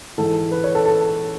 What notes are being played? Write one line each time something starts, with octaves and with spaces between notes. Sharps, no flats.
G#2 E3 A4
B4
C#5
A4
A4